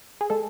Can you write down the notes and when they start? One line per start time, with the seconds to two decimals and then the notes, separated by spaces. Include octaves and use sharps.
0.21 G#4
0.30 G#3 A4